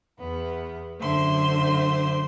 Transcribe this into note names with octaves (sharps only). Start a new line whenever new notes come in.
E2 B3
F#2 D3 C5 E5 C6